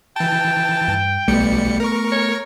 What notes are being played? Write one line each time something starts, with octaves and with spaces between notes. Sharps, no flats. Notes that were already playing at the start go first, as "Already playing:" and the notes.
E3 G5 A5
G2
B1 G3 A3 B3 C#7
A#4 C#6
C#5